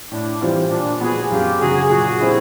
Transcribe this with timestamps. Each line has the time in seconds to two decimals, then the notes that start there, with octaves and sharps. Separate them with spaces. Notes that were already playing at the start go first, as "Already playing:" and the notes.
0.11 A2 D4
0.41 E3 G3 C4 F4
0.71 A#2 D4
1.01 F3 G#3 B3 F#4 G#4
1.31 F#2 F4 G4
1.60 C#3 F#3 F#4 G#4
1.90 A#2 F#4 G#4
2.20 G3 C4 E4